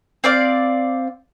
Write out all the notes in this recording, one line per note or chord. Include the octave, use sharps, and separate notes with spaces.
C4 D5 F5